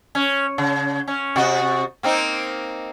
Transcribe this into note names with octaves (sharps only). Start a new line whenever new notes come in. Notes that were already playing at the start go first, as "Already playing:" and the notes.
C#4
C#3
C#4
C3 F#4 D#5
A#3 C4 D#4